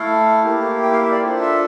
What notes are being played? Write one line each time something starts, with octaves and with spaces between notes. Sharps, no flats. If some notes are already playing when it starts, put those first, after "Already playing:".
Already playing: A3 E4 A4 F5
A#3 E4 G4
G5
F5
E5
D5
D4 F4 A4 C5
E5